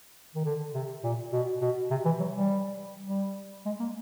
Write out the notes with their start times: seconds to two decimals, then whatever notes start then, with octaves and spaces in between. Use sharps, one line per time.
0.35 D#3
0.45 D3
0.74 C3
1.03 A#2
1.32 B2
1.61 B2
1.90 C3
2.05 E3
2.20 F#3
2.34 G3
3.06 G3
3.65 G#3
3.80 A#3